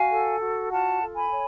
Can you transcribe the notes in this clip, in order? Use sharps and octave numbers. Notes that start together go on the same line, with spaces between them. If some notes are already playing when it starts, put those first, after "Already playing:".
Already playing: F#4 F5 G#5
A4
F#4
F4 F#5 A5
A4
G#5 B5
C#5